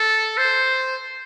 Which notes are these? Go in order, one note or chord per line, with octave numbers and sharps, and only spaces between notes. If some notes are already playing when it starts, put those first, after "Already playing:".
Already playing: A4
C5